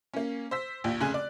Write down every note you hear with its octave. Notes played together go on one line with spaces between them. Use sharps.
A#3 C#4
C5 E6 B6
A#1 D#2 G5
F1 C#3 G#4 G#5 F#6
D5